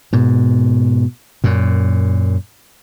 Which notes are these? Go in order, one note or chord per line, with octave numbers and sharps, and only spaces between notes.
G#2 B2
F#2 A#2